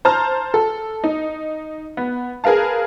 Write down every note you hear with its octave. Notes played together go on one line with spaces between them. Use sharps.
C5 A5 A#5 F6
A4
D#4
B3
G#4 A#4 B4 F5 A5